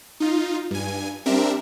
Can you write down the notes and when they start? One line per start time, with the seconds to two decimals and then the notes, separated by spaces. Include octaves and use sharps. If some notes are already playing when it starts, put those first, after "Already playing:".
0.20 D#4 F4
0.71 G2 G#5
1.26 G3 C4 D4 A#4 E5